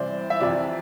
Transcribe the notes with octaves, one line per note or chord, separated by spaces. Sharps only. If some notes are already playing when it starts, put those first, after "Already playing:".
Already playing: C2 C3 E3 C5 D5
E5
F2 C3 E3 D5